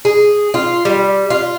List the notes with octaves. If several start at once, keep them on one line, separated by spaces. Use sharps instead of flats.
G#4
F4
G3
F4